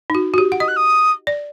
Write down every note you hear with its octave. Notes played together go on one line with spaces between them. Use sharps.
D#4
F#4
F#4
G4
F#5
D#5 D#6
F#6
D#6
D5